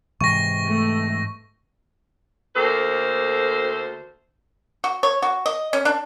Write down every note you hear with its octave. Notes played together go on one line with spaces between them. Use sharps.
G#2 C3 E3 C#6 A#6
A3
D2 A#3 A4 C5
F#4
C#5
F#4
D#5
C#4
D4